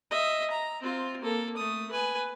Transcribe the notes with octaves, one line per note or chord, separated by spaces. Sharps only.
D#5 E5
A#5
C4 F4
A#3 A4
A3 D#6
B4 G#5